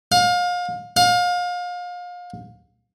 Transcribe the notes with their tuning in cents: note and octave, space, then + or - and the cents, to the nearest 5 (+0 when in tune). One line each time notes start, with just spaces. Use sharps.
F5 +30
F5 +30